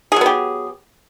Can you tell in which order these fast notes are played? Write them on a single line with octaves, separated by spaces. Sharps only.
G#4 F#3 B3 G4